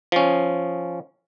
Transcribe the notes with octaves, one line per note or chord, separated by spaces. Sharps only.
F3 C#4